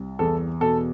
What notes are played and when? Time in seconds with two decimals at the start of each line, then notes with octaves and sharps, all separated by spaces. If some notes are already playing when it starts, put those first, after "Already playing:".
Already playing: C2
0.19 E2 A4
0.61 B2 A4